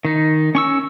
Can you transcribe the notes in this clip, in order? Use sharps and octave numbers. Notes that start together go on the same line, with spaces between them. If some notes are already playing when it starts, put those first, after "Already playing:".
D#3 D#4
C#4 C#6 E6